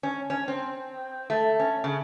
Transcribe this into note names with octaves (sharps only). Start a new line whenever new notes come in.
C#4
C#4
C4
A3
C#4
C#3